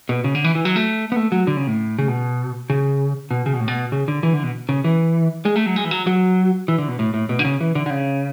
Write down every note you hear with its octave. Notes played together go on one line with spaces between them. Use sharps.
B2
C#3
D3
E3
E3
F#3
A3
B3
A3
F#3
D3
C#3
A2
C#3
B2
C#3
B2
C#3
B2
A2
B2
C#3
D3
E3
D3
B2
C#3
E3
G#3
A3
F#3
G#3
E3
F#3
F#3
E3
D3
B2
A2
A2
B2
D3
C#3
E3
D3
D3
C#3